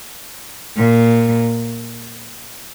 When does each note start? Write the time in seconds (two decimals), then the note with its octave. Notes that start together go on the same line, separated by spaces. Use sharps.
0.76 A#2